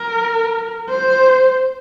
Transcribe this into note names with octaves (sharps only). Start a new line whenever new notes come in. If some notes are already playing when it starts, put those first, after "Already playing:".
Already playing: A#4
C5